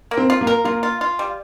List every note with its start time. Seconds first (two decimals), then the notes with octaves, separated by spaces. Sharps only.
0.11 A#3
0.17 C4
0.30 F4
0.41 A#3
0.47 A#4
0.65 A#3 F4
0.83 F4
1.01 F4
1.19 G3